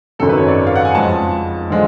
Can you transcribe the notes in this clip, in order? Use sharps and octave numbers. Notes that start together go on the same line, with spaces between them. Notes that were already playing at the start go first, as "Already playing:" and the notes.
G#1 F#2 C#3 F#3 A4
B4
C#5
D5
F5
F#5
G#5
F2 F3 G#3 A5
D3 F3 G#3